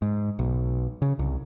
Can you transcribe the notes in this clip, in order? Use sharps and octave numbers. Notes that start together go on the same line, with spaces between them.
G#2
B1
C#3
C2